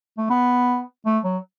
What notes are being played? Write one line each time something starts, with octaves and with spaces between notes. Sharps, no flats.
A3
B3
A3
F#3